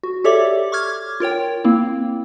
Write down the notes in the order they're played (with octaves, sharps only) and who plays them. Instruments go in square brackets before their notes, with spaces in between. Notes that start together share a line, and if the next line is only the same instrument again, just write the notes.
[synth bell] F#4
G4 A4 C#5 D5 E5 D6
C#6 D6 F6 G#6
F4 A#4 C#5 G5
A#3 C4 E4